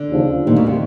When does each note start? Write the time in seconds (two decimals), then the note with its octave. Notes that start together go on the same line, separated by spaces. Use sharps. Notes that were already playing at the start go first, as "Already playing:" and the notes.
Already playing: D3
0.09 D#2 C#3 F3
0.43 D#2 A#2 D#3 G3 A#3
0.56 B2
0.67 C3